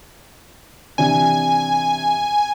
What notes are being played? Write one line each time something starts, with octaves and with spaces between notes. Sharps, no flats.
C3 E3 D4 G#5